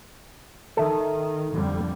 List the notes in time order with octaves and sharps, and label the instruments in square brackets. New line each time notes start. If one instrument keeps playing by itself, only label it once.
[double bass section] D#3 [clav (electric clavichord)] A4 E5
[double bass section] F2 D3 G3